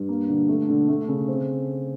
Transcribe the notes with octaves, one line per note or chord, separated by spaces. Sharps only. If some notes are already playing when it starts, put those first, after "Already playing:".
Already playing: G2
A#3
D3
A3
D3
A3
C#3
C4